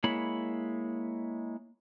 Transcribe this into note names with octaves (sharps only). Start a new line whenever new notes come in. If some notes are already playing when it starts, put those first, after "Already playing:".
G#3 A#3 E4 C#5 B5